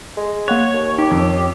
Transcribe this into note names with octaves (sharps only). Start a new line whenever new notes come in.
G#3
A#3 C#5 F#5 F#6
D#2
D#4 G4 D6
F2 C#4